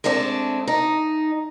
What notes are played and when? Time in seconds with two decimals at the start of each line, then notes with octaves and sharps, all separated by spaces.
0.04 G#3 A3 C4 D4
0.67 D#4